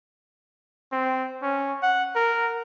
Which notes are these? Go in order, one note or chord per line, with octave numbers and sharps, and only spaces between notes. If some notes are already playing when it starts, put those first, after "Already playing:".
C4
C#4
F#5
A#4